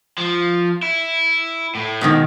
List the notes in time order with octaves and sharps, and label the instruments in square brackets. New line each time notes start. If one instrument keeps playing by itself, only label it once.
[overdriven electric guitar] F3
E4
A2
[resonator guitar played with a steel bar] G#2 B2 D#3